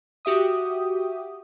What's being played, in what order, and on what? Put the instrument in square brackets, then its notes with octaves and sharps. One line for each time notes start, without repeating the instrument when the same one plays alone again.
[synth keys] F#4 G4 E5 D#6